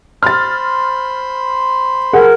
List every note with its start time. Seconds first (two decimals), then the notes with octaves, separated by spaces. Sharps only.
0.23 C5 B5 C6 F6 A6
2.13 G#4 A#4 F#5